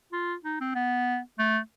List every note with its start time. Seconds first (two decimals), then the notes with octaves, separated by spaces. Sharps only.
0.13 F4
0.45 D#4
0.60 C4
0.75 B3
1.39 A3